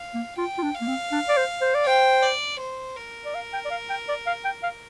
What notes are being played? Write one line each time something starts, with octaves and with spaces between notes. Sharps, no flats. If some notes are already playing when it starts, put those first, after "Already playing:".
Already playing: F5
A#3
F4 G5
F4
D4
F5
A#3
C4
D4
D5
C5
C5
D5
C5 G5
D5
C5
A#4
D5
F5
G5
D5
F5
G5
D5
F5
G5
F5